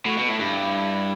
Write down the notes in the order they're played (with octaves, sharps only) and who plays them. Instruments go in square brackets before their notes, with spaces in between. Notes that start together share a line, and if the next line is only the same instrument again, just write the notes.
[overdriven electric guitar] A2 [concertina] F#4
[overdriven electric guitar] B2
[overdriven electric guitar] A2 [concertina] E4
[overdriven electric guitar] G2